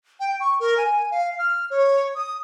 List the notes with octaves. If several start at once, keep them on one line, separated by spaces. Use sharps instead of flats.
G5
C#6
A#4
G#5
F5
F6
C#5
D#6